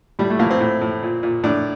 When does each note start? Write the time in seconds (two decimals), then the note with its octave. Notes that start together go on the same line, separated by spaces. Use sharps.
0.19 A2 G3
0.30 A3
0.39 A2 A#3
0.51 C4
0.61 A2
0.81 A2
1.02 A#2
1.23 A#2
1.44 A2 D4